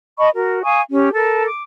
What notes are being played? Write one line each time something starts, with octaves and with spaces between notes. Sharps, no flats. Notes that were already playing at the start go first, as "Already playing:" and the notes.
D#5 A5 B5 C#6
F#4 A#4
F5 G#5 C#6 D#6
C#4 G4
A4 A#4 A5
D6